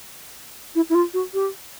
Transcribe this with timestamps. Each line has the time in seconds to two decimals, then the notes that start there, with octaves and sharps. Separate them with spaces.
0.75 E4
0.90 E4
0.95 F4
1.14 F#4
1.34 G4